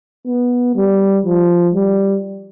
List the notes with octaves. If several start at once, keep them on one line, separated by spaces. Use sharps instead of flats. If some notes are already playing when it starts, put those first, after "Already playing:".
B3
G3
F3
G3